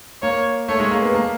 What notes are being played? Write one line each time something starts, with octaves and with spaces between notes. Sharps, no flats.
A#3 C#5
A3 C#5
G#3
A#3
B3
A#3